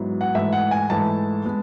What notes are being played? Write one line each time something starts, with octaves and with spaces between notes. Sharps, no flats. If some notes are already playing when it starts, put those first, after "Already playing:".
Already playing: G#2 F#3 B3 E4
F#5
G#2 E3 A3 E5
F#5
G#5
G#2 E3 A3 A5
G#3 B3